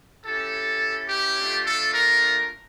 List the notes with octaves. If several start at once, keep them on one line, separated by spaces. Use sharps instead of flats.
C#4 E4 G4 A4
G4
A3 D4 F4
A4
A#4